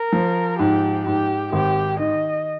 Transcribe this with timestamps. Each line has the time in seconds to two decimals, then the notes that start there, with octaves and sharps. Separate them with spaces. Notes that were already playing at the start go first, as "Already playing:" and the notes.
Already playing: A#4
0.12 F3
0.59 G#2 G4
1.05 G#2 G4
1.52 G#1 G4
1.99 D#3 D#5